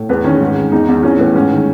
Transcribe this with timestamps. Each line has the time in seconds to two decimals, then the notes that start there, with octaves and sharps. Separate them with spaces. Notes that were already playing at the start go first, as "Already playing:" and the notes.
Already playing: A2
0.09 E2 B3
0.24 D#3 C#4
0.40 G#2
0.56 D#3
0.72 E2 D#4
0.88 E2
1.03 E3 C#4
1.19 A2 B3
1.35 G#2 C#4
1.51 D#3